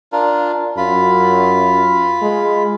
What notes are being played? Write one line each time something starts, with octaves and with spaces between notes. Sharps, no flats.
D4 F4 A#4
F#2 F4 B5
G#3